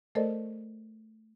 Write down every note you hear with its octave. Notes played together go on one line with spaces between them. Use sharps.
A3 A4 A#4 C5 D5 D#5